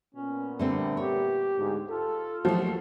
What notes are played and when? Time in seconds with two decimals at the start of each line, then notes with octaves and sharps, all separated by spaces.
0.15 A#2 B3 C#4
0.59 D3 G3 A3 C4
0.97 G4 C#5
1.57 D2 G#2
1.88 F4 A4
2.45 D#2 F3 F#3 A3